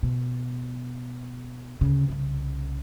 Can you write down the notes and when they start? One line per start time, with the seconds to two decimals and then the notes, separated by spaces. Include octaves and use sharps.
0.03 B2
1.81 D2 C#3
2.09 C2 C#3